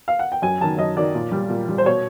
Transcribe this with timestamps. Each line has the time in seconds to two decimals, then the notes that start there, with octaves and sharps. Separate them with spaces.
0.08 F5
0.19 F#5
0.32 G5
0.42 F#2 G#5
0.60 D#3 F#3 A5
0.78 F#2 D#5
0.96 D#3 F#3 D5
1.15 A#2
1.32 G3
1.50 A#2
1.68 G3
1.78 C5
1.85 B2 C#5